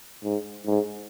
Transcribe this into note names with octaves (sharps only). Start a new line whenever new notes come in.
G#2
G#2